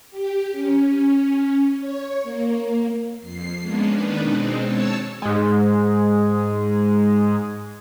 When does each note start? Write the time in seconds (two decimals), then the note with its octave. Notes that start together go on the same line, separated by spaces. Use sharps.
0.11 G4
0.52 C#4
1.81 C#5
2.23 A#3
3.20 F2 C7
3.61 G#3 A#3 B3 C#4 D4
3.90 D#3 D4 D#4 B4
4.21 B2 G#3 C4
4.61 C#5 A5 E6
5.22 G#2 G#3